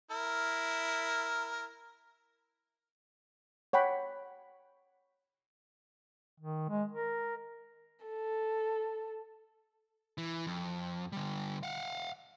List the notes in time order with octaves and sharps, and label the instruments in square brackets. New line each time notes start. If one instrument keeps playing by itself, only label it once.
[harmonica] E4 A#4
[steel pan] C#5 F#5 G5 B5
[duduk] D#3
G#3
A#4
[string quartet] A4
[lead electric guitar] E3
F2
D3 G3
F5 F#5